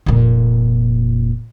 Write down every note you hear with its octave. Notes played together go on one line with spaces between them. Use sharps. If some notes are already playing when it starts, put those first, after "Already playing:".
F1 A#2